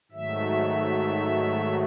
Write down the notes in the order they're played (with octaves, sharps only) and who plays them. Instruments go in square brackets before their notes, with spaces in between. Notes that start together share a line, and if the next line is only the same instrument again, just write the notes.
[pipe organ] G#2 D#3 F#3 A3 E5